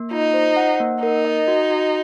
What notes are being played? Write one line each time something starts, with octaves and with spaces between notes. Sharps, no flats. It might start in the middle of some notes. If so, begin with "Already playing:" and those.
Already playing: A#3
D#4 F4
C5
F#5
A#3
D#4 A#4
D#5
F#4
F#4